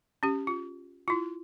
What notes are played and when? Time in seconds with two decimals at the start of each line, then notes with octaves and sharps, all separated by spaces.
0.23 C#4 G4
0.47 F4
1.08 E4 F4